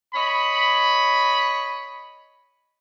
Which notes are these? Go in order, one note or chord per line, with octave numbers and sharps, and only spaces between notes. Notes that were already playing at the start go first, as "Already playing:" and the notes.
C#5 D#5 B5